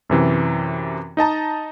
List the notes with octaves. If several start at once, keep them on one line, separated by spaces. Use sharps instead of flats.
F#2 C3 E3
D#4 D#5 A5 A#5